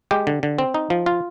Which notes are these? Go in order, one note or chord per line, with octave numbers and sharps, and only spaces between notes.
G#3 G4
D3
D3
C4
D#4
F3
F4